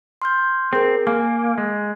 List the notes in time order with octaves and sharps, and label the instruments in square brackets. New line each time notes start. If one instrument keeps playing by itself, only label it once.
[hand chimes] C6 F6 G6
[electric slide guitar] C4 [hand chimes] G#4 A#4
[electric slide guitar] A#3 [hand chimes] G#5
[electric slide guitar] G#3